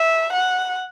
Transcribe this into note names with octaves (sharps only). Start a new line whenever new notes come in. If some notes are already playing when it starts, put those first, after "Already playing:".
Already playing: E5
F#5